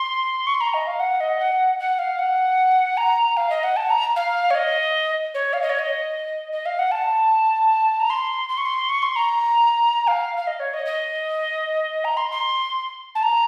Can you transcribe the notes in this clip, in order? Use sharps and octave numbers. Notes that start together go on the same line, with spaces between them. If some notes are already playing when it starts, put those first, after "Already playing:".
Already playing: C6
C#6
C6
A#5
D#5
F5
F#5
D#5
F#5
F#5
F5
F#5
A#5
F5
D#5
F#5
A5
A#5
F5
C#5
D#5
C#5
F5
D#5
C#5
D#5
D#5
F5
F#5
A5
A#5
C6
C6
C#6
C6
C#6
C6
A#5
F5
F5
D#5
C#5
D#5
D#5
A#5
C6
C6
A5
A#5